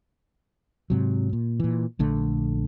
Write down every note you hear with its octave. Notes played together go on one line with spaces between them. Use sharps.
G#2 C3 F#3
A#2
A#2 E3
A#1 D3 A3